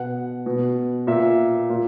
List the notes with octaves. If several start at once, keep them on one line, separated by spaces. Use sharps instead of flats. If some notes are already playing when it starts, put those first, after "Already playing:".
Already playing: B2 F#5
B2
A#2 E5
A#2